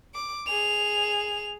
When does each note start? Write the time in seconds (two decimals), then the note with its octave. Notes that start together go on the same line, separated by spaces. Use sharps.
0.15 D6
0.47 G#4 F7